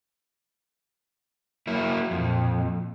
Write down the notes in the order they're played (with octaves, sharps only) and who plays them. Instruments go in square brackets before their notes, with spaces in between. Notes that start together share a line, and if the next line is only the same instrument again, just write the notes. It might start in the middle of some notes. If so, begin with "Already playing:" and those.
[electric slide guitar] F#3 A#3 E4
[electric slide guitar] F2 [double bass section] A#2